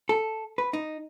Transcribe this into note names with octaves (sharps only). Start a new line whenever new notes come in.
A4
B4
D#4